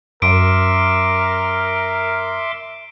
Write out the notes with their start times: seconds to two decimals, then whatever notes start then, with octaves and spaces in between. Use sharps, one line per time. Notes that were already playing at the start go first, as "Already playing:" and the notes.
0.22 F#2 A#4 E5 C6 D6 D7